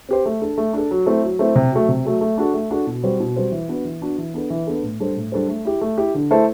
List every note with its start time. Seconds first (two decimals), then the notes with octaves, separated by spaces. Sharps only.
0.09 C4 G4 C5
0.25 A3
0.42 D4 A4
0.58 A3
0.73 D4 A4
0.91 F#3
1.06 A3 C4 E4
1.23 F#3
1.39 A3 C4 E4
1.56 C3
1.72 F#3 A3
1.89 C3
2.05 F#3 A3
2.21 A3
2.38 D4 F#4 A4
2.54 A3
2.71 D4 F#4 A4
2.87 B2
3.03 G3 C4 F#4 C5
3.20 B2
3.36 G3 C4 F#4 C5
3.52 E3
3.68 B3 D4 F#4
3.85 E3
4.01 B3 D4 F#4
4.18 E3
4.34 B3 D4 A4
4.50 E3
4.67 B3 D4 A4
4.83 A2
5.00 G3 D4 A4 C5
5.16 A2
5.32 G3 D4 A4 C5
5.49 A3
5.65 E4 G4
5.81 A3
5.98 E4 G4
6.15 D3
6.31 A3 E4 A4 C5